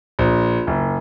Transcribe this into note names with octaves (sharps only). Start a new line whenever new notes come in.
A#1
F#1